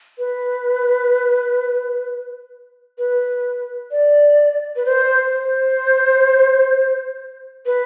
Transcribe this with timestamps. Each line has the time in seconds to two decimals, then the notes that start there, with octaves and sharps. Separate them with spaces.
0.18 B4
2.98 B4
3.91 D5
4.76 B4
4.86 C5
5.32 C5
7.66 B4